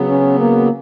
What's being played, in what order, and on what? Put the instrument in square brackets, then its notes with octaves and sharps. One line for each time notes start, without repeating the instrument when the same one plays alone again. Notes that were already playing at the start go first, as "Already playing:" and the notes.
Already playing: [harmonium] C#3 F#3 B3
[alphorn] C#4
A#3